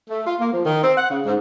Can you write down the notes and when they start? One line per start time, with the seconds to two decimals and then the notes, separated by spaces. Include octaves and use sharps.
0.10 A3
0.26 F4
0.40 A#3
0.52 F3
0.65 D#3
0.84 C4
0.97 F#5
1.11 C#3
1.25 G#2